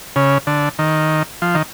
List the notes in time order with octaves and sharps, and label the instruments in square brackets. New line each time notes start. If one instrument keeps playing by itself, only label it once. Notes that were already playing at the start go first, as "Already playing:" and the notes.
[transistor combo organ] C#3
D3
D#3
F3
D#3